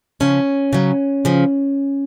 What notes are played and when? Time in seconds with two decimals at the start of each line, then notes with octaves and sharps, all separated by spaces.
0.20 C#3 F3 C#4
0.73 C#3 F#3
1.25 C#3 F3